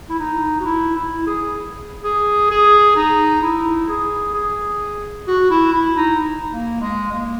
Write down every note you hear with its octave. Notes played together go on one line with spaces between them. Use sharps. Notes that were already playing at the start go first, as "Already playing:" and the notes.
E4
D#4
F#4
E4
E4
G#4
G#4
G#4
D#4
E4
G#4
G#4
F#4
E4
E4
D#4
A#3
G#3
A#3